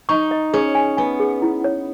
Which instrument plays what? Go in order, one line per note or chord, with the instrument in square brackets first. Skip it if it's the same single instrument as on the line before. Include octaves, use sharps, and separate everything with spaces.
[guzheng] D#4 [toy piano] C#6
[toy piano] D#5
[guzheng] C#4 [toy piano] G#4
[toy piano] G#5
[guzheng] B3 [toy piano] G#5
[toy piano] G#4
E4
C#5